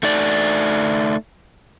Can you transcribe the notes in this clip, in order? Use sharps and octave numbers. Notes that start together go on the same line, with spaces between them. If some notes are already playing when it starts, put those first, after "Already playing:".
A3 D#4 D5